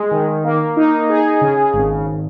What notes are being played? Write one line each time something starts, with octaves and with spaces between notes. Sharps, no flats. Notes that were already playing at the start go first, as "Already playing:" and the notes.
Already playing: G#3
D#3
A#3
D#4
G#4
C#3
G#1